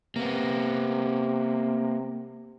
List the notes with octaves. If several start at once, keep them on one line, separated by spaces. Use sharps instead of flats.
C3 A#3 B3